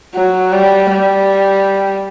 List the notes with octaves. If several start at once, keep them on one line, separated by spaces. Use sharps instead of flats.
F#3
G3
G3